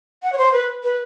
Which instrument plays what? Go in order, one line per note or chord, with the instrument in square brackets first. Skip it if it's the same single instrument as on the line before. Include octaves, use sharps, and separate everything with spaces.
[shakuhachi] F#5
C#5
C5
B4
B4